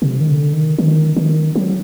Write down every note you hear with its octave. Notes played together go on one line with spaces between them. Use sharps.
C3
D#3
D3
D#3
D#3
D#3
F#3